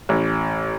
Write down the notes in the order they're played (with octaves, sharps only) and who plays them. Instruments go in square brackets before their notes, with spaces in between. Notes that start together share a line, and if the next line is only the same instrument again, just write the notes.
[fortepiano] A1